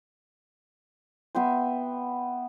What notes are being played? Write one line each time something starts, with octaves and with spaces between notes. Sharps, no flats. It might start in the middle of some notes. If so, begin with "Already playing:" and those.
B3 E5 G5 C6